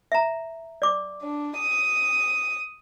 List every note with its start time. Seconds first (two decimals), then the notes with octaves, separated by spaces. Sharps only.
0.12 E5 A#5
0.82 D5 D6
1.22 D4
1.57 D#6